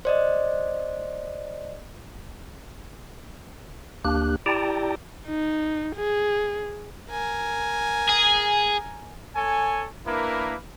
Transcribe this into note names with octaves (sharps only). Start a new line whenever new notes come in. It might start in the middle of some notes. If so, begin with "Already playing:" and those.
C5 D5 D#5
D2 A#3 D4 G4 F#6
E4 G4 D5 G5 A5 A#5
D#4
G#4
A#4 G#5
G#4
A4 C#5 G#5
A#3 D4 E4 A#4 B4